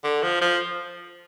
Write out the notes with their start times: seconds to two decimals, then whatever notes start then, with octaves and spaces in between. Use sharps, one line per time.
0.04 D3
0.23 F3
0.41 F3